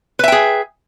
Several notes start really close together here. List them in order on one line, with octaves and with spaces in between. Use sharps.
B4 E5 G5 G#4